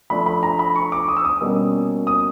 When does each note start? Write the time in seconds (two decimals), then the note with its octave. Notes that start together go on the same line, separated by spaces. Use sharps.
0.10 F3 A3 D4 B5
0.26 B5
0.43 A#5
0.59 B5
0.76 C#6
0.92 D6
1.08 D#6
1.17 E6
1.25 D#6
1.41 B2 G3 A#3 C#4
2.07 D#6